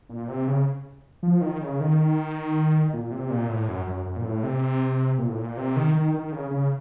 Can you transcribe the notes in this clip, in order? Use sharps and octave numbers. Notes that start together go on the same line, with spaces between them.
A#2
C3
C#3
F3
D#3
C#3
D#3
A#2
C3
A#2
A2
F#2
F#2
F#2
A#2
A2
C3
A#2
A2
A#2
C3
D#3
D#3
D#3
C#3
C#3